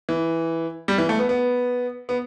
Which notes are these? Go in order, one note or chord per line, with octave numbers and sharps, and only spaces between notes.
E3
G3
E3
A3
B3
B3
B3